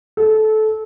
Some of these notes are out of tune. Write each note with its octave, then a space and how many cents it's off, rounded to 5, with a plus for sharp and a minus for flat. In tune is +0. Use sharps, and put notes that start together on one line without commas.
A4 -20